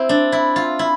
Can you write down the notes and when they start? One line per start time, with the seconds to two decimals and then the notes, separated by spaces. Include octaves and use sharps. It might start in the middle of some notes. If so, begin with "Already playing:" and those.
Already playing: C4 E4
0.09 D4
0.32 E4
0.56 F4
0.79 E4